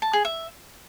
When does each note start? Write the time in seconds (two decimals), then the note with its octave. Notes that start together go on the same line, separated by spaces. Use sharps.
0.02 A5
0.13 G#4
0.25 E5